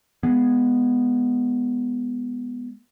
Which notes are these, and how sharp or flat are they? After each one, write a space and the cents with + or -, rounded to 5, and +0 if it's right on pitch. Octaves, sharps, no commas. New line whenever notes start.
G#3 -5 B3 +0